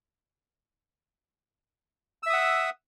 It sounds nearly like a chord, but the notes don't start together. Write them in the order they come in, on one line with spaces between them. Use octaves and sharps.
E6 E5 D#6 F#5